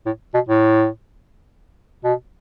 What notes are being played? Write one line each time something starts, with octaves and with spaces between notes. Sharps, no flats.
A2
B2
A2
B2